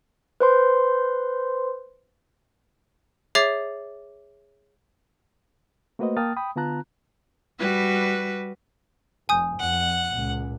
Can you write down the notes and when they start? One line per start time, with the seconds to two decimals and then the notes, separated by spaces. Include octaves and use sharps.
0.40 B4 C5 C6
3.35 G#4 C#5 E5 D6 A6 C7
5.99 A3 A#3 F#4 B4 C5 D#5
6.17 A#3 G5 A5 D#6 F6 A6
6.36 G5 B5 D#6
6.56 D3 B3 F4 A5 A#5 F#6
7.59 G3 F#4 B4
9.29 F1 G#5 D#6 G6
9.60 F2 F#5
10.13 C#2 A#2